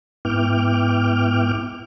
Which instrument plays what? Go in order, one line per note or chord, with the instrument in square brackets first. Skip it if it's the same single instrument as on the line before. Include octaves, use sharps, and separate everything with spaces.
[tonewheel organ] G#2 B3 E4 G5 D6 F6